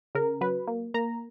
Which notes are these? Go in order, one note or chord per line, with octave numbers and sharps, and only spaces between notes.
C#3 A#4
F#3 B4
A#3
A#3 A#5